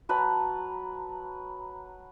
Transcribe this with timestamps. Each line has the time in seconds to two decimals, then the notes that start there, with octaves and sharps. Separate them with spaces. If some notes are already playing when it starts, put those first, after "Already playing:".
0.09 F#3 B4 A5 A#5